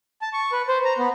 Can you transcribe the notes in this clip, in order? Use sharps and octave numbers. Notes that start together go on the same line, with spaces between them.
A5
C#6
B4
C5
A#5
B3